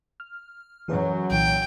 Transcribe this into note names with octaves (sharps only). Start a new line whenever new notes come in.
F6
F#2 E3 F#3 G#4 B4
C2 A#2 E3 G5